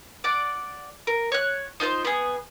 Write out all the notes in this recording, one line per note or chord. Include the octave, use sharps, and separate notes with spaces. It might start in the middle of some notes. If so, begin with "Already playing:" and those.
D5 F#5 D6
A#4
C#5 F#6
D#4 F4 B4 C5
B3 G#4